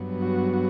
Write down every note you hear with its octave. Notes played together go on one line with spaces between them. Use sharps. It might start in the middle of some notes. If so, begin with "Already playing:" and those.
Already playing: G2 F#3 B3
F#4
F#4